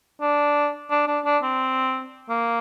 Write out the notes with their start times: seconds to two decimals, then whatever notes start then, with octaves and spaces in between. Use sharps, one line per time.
0.21 D4
0.90 D4
1.07 D4
1.25 D4
1.43 C4
2.29 A#3